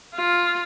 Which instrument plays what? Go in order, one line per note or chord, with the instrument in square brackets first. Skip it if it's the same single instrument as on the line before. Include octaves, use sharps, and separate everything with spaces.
[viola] F4